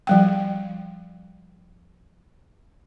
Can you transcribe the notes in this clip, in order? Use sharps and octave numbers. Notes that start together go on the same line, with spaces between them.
F3 G3 G5